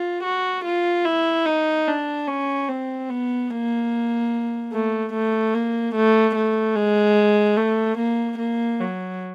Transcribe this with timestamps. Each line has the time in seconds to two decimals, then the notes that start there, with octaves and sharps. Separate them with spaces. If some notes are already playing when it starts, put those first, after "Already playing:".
Already playing: F4
0.24 F#4
0.65 F4
1.05 E4
1.46 D#4
1.88 D4
2.28 C#4
2.69 C4
3.09 B3
3.50 A#3
4.72 A3
5.13 A3
5.54 A#3
5.95 A3
6.35 A3
6.76 G#3
7.57 A3
7.98 A#3
8.38 A#3
8.80 F#3